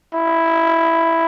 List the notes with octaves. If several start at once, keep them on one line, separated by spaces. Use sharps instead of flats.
E4